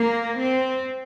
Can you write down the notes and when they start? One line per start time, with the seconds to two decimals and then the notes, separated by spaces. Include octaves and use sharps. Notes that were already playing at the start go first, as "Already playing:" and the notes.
Already playing: A#3
0.37 C4